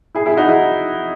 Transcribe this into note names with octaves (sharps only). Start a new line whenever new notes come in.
E4 G#4
E4 G#4
D#4 F#4
E4 G#4